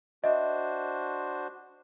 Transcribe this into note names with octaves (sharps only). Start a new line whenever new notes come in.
D4 F#4 C5 D#5 E5